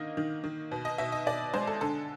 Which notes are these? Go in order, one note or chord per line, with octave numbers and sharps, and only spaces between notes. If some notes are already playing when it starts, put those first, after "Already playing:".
Already playing: D3 D#3 A#3 D#5
D#3
D#3
B2
D#5
B2 E5
D#5
B2 D5
G#3 C5
A4
D3 A4